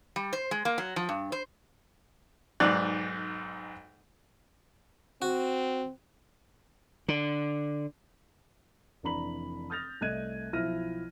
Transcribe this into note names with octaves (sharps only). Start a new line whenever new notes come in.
G3
C5
G#3
A#3
F#3
F3
G2
C5
B1 G#2 D5 F#6
C4 F#4
D3
F1 E3 D4 A#5 B5 F#7
D#6 F6 G6 A6 A#6 F7
C2 A3 D#5 F#6 G#6 D#7
B1 F3 E4 F6 A#6 D#7